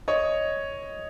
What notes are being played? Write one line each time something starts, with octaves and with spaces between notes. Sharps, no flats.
C#5 D#5